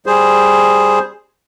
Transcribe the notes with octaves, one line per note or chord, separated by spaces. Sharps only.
G3 G#4 C5